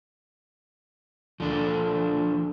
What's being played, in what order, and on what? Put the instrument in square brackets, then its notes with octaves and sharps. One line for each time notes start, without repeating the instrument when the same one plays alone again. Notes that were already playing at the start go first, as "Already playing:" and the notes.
[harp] D2 [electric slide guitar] F3 D4